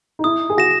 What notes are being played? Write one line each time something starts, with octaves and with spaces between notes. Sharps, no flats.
D#4
E4 D#6
G#4
F#4 A#6 E7